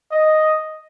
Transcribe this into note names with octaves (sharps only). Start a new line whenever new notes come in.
D#5